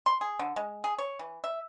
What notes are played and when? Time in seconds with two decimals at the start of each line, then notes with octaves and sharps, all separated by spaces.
0.06 C6
0.21 G#4
0.39 D3
0.56 G#3
0.84 G#4
0.98 C#5
1.19 E3
1.44 E5